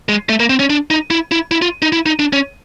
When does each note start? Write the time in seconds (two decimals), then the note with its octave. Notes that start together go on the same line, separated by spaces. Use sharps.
0.09 G#3
0.29 A3
0.40 A#3
0.49 C4
0.60 C#4
0.70 D4
0.90 D#4
1.11 E4
1.32 E4
1.51 E4
1.62 F4
1.82 D#4
1.92 E4
2.06 D#4
2.19 D4
2.33 C#4